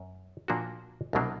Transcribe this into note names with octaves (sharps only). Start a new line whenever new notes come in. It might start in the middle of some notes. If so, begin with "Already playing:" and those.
Already playing: F#2
A#2 F3 A#3 D4 F#4
C2 B2 F#3 A#3 D4